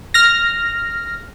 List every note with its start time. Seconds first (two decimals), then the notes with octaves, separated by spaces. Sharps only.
0.14 F6 A#6